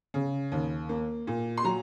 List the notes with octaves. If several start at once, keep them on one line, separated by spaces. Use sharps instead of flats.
C#3
D#2
A#3
A#2
C6
F#3 A#5